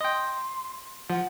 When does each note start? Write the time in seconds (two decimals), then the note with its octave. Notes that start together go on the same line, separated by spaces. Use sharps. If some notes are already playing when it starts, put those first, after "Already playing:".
0.01 D#5 G5 C6
1.10 F3 F#5